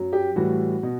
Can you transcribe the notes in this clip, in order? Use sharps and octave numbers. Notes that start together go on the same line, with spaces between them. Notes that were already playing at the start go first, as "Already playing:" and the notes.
Already playing: F#2 F#3
G4
A2 E3 G3 F#4
B2